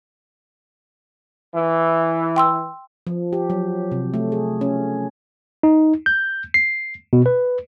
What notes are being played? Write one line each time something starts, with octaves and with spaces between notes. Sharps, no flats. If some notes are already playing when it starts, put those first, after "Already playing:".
E3
G5 C6 E6
F3
G4
F#3
C3
A3
G#4
C#4
D#4
G6
C7
B2
B4